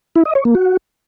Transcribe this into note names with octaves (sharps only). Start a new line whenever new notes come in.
E4
D#5
C#5
A#3
F#4